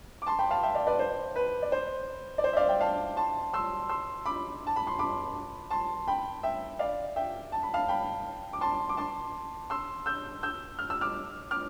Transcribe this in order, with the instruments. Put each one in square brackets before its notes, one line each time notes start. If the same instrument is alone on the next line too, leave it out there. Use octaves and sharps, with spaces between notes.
[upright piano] D6
A5 C6
G5 B5
F5 A5
E5 G5
D5 F5
B4 D5
C5
B4
D5
C5
D5
C5
E5
D5 F5
E5 G5
F5 A5
A5 C6
C6 E6
C6 E6
B5 D6
A5
B5
C6
B5 D6
A5 C6
G5 B5
E5 G5
D5 F5
E5 G5
A5
B5
F5 A5
G5 B5
D6
A5 C6
D6
A5 C6
C6 E6
E6 G6
E6 G6
F6
E6
D6 F6
D6 F6